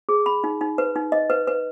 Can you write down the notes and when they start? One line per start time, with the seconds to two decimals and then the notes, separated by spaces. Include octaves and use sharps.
0.09 G#4
0.26 B5
0.44 D#4
0.61 D#4
0.78 B4
0.96 D#4
1.12 D#5
1.30 B4
1.47 B4